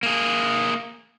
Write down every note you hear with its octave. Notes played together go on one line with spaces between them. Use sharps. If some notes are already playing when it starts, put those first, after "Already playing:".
A#3 G#4